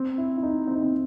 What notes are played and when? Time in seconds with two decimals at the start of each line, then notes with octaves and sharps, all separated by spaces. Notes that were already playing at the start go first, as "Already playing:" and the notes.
Already playing: C4
0.18 E4
0.37 E4
0.43 D#4
0.68 C4
0.75 D#4
0.83 C4